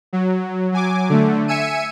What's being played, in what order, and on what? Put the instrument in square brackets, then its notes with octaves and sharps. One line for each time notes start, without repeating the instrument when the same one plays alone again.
[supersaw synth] F#3
F#3 G#5 D6
D3 A3
E5 G#5 E6 C#7 D#7